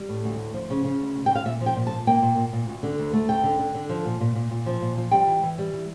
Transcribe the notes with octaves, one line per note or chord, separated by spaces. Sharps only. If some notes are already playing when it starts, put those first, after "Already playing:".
Already playing: G3
A2
D2
D2
F3
C#3
C#3
D2
D2
G5
D2
F5
A#2 E5
F3
G5
A#2
A5
A#2
A#3 G5
A#2
A#2
A#2
D2
D3
D2
A3
D2 G5
D3
D3
D3
F3
A#2
A#2
A#2
A#2
F3
A#2
F3
G3 G5
E3
E3
G3
E3